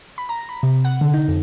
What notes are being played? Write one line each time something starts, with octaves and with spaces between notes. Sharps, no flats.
B5
A#5
B5
C3
F#5
D3
D#4
F2